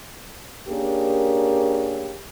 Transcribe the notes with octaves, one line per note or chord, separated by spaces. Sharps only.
A#3 C#4 D4 G4 G#4 A#4